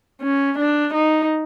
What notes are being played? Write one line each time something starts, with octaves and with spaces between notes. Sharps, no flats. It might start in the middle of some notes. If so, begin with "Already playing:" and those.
C#4
D4
D#4